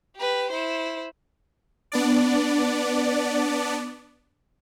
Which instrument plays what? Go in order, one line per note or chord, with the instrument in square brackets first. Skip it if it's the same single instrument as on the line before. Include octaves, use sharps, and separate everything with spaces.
[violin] G4 B4
E4 C5
[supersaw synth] B3 D4 D5